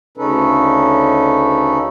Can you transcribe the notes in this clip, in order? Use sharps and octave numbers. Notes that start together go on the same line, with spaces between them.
D2 C#3 C#4 D#4 A4 B4